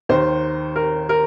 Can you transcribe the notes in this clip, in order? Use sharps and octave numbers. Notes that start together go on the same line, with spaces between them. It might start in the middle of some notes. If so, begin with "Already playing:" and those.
D#2 D#3 C5
A#4
A#4